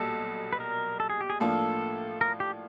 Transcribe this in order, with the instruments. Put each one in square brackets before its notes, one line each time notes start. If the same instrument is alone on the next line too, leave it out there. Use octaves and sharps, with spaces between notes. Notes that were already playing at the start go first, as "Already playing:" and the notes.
Already playing: [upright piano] B1 A#2 G3 [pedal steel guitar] A4
[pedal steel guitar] B4
A#4
A4
G#4
G4
G#4
[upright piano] A2 F3 A#3 D4 F4 [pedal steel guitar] A4
[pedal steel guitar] A#4
G4